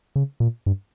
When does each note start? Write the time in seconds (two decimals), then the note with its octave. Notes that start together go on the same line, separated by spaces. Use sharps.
0.16 C#3
0.40 A#2
0.66 G2